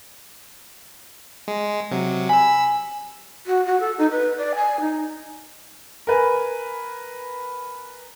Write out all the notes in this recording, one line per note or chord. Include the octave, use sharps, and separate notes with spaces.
G#3
C3 F#3
G#5 B5 E6
F#4
F#4
A4
D#4
B4
D5
G#5
D#4
A#4 B4 G#5